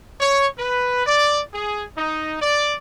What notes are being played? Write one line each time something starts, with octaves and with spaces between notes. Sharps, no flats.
C#5
B4
D5
G#4
D#4
D5